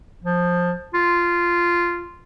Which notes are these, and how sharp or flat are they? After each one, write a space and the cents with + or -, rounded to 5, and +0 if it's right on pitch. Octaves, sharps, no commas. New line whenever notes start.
F3 +15
F4 -10